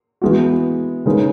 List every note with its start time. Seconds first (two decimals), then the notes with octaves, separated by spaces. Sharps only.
0.22 E3 G#3 B3 F#4
1.06 C#3 G#3 D#4 G#4 B4